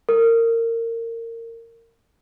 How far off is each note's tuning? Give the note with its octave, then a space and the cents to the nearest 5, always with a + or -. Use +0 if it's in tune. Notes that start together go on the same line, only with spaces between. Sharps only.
A#4 -25